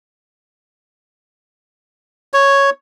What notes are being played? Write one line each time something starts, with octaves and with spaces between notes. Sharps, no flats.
C#5